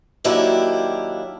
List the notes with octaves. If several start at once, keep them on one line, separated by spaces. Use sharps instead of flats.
D#3 F#3 A#3 D4 E4 G4